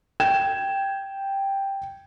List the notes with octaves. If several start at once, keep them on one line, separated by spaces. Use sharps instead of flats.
G5 G#6 E7